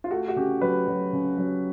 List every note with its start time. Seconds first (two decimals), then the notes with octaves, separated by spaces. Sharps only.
0.04 F4
0.11 A3 F#4
0.28 F#4
0.36 C#3 G4
0.61 F#3 B4
0.88 F#3
1.13 C#3
1.38 F#3